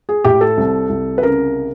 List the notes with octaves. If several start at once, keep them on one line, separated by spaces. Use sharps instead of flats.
G#4
A2 G4
A4
C2
C2
B4
C#3 A#4